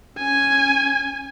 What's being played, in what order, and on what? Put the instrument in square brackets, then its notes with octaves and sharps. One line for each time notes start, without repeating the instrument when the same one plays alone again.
[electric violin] C#4 G#5